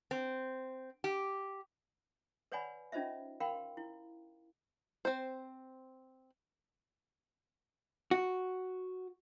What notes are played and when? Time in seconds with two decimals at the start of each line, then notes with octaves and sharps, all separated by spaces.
0.11 C4
1.04 G4
2.52 B4 C#5 D5 F#5 G#5 B5
2.92 C#4 D#4 F4 C5 D#5 E5
3.40 A#4 F5 G5 B5 C6
3.77 E4
5.05 C4 C5
8.11 F#4